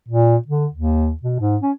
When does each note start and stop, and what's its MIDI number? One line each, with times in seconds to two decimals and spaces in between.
0.08 0.36 46
0.48 0.67 50
0.73 1.13 39
1.23 1.36 47
1.40 1.57 44
1.62 1.72 61